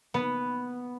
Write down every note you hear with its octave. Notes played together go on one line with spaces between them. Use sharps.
B3